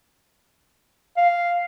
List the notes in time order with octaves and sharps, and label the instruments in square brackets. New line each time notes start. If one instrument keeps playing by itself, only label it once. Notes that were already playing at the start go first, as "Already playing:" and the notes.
[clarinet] F5